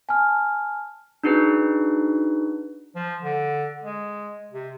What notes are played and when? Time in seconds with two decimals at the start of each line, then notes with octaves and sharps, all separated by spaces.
0.09 G#5 A5 F6
1.23 D4 D#4 F#4 G#4 B4
2.96 F3
3.23 D3
3.83 G#3
4.52 C3